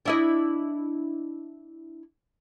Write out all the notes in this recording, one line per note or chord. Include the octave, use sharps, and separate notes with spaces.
D4 E4 D#5